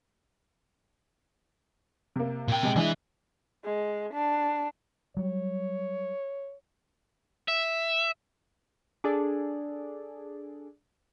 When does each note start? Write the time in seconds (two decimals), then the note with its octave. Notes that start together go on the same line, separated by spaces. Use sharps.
2.16 C3 A#3
2.48 A#2 G5
2.63 C3 G#3
2.76 E3 G#3 D4 E4 E5
3.64 G#3
4.13 D4
5.17 F#3 G3 C#5
7.48 E5
9.04 D4 G#4 A4 D5